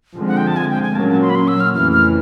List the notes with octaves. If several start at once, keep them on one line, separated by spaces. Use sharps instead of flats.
D3 F3 G#3 C4
F#5
G5
A5
G#5
G5
G#5
A#2 F#3 A#3 C#4 A5
A5
C6
B5
C6
E6
F6
F2 C#3 E3 A3 F6
F6